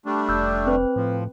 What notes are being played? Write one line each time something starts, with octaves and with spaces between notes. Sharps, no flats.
G3 A3 D4
F1 E6 G6
C4 B4
A2 F3